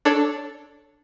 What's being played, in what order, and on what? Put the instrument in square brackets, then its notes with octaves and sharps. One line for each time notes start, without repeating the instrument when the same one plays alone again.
[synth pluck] D4 A4 C#5